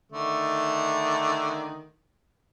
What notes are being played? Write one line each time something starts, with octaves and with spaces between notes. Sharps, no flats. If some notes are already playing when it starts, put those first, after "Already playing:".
D3 D#3 A3